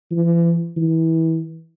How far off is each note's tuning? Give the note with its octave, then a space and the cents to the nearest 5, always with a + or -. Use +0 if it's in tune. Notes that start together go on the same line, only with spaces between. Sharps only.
E3 +40
E3 -25